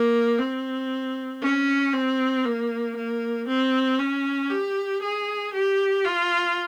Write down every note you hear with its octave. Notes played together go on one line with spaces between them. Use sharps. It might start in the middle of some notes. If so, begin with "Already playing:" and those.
Already playing: A#3
C4
C#4
C4
A#3
A#3
C4
C#4
G4
G#4
G4
F4